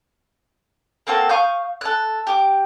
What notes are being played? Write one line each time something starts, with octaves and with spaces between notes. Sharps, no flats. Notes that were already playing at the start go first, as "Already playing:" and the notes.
A#3 C4 F#4 A4
F5 C#6 D#6 G6
A4 F#6
G4 D6